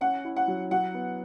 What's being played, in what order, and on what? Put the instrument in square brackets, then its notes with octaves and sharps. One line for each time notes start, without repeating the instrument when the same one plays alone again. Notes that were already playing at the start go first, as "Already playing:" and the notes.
[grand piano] C#4 [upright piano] F#5
[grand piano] E4
[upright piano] F#5
[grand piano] F#3
[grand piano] F#3 [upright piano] F#5
[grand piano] B3